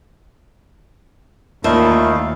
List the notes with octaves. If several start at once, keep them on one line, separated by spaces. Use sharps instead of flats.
D#2 A#2 A3 D#4 E4 F5